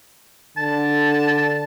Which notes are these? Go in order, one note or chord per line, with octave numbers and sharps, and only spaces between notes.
D3 A5